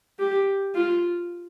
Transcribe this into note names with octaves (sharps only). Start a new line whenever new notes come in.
G4
F4